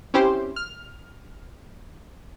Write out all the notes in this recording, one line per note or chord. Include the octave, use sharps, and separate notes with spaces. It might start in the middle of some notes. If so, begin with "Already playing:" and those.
C4 C#4 E4 G4 C5
F6